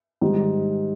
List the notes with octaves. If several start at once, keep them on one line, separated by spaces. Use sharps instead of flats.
G#2 D#3 G3